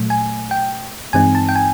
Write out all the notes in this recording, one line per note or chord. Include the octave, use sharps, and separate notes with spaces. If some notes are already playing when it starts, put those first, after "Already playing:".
Already playing: A#2 F#3 A3
G#5
G5
G2 E3 G#3 C4 D#4 G#5
A5
G5
G#5